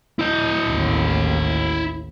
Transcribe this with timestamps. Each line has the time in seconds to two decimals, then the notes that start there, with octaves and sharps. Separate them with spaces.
0.19 E4 D#5
0.68 A1 D#2